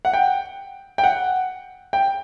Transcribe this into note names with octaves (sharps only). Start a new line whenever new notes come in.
F#5
G5
G5
F#5
G5